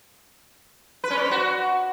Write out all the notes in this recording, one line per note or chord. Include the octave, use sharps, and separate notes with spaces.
B4
C#4
D5
C5
F#4